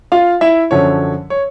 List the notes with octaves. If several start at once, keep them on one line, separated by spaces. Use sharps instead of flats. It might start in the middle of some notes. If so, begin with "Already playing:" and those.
F4 F5
E4 E5
F#2 D3 F3 C#5
C#5